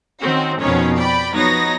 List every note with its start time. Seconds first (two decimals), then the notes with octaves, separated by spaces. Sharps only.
0.20 D#3 C4 C#4 F#4
0.60 F2 B2 D#3 C#4 C#5
0.97 D5 G5 B5
1.33 F3 F#3 B3 D#4 C#5 A#6